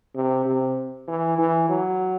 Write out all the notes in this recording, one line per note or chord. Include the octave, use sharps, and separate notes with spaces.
C3
C3
E3
E3
F#3